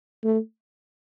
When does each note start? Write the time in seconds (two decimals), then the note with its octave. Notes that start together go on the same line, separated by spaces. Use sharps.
0.24 A3